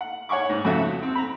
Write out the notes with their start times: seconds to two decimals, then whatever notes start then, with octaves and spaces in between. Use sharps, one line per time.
0.01 F#5
0.29 C#5 F#5 G#5 C#6 D6
0.49 G#2
0.65 F2 C#3 F#4 A4 E5
1.03 C4
1.15 A#5 B5